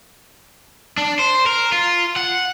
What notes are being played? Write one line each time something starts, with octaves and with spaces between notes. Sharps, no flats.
D4
C5
A#4
F4
F#5